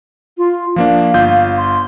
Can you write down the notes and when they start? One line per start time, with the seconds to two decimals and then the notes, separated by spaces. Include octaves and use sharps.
0.38 F4
0.76 F3 A#3 D4 F5
1.14 G1 F4 G6
1.57 C6